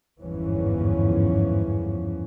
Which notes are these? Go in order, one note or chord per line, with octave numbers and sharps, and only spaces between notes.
G1 E2 G#2 E3 F3 C#4